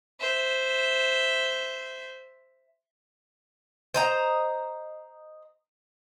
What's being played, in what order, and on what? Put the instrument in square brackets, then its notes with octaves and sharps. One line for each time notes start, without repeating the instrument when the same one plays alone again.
[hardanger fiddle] C5 E5
[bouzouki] C5 D#5 A#5